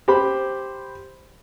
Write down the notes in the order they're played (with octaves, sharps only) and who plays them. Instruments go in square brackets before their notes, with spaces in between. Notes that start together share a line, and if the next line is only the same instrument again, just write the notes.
[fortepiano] G4 C5 B5